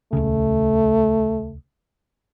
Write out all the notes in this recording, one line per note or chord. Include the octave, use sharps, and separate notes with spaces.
D#1 C#2 C#3 A3